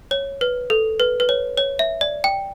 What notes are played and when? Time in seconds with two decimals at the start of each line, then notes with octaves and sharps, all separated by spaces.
0.11 C#5
0.41 B4
0.70 A4
1.00 B4
1.20 B4
1.29 C#5
1.58 C#5
1.79 E5
2.01 D5
2.24 G5